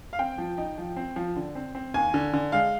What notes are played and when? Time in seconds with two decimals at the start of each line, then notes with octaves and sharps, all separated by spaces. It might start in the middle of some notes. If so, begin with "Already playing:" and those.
0.13 F5
0.19 C4 G5
0.38 F3
0.58 D#4
0.78 F3
0.96 C4
1.16 F3
1.36 D3
1.55 C4
1.75 C4
1.94 D#2 G#5
2.14 D3
2.33 D3
2.52 G#3 F5